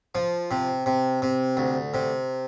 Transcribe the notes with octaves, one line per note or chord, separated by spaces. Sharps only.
F3
C3
C3
C3
D2
C3